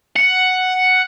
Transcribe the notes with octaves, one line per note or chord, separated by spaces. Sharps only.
F#5